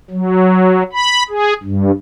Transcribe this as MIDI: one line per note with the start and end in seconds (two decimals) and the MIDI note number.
0.10 0.83 54
0.93 1.23 83
1.29 1.53 68
1.63 1.91 43